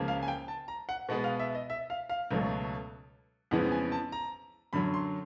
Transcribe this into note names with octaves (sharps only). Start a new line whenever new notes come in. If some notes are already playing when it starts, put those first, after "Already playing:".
Already playing: C#2 C#3 F3 A#3
F5
G#5
G5
A5
A#5
F#5
B2 G#3 B3 F#5
F5
E5
D#5
E5
F5
F5
C#2 B2 F#3 A3
F2 C#3 E3 G#3 B3 F#5
G#5
A5
A#5
F#2 D3 F#3 B5
C6